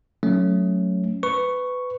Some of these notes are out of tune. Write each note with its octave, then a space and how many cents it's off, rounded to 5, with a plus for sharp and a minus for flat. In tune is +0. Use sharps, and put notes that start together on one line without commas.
F#3 +0 A3 +0 C#4 +0
B4 +20 C#6 +0